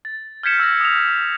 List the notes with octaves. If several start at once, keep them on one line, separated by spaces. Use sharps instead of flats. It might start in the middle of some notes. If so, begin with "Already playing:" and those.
A6
F6 G6 G#6 B6 C#7 E7
E6 A#6
D#6 F7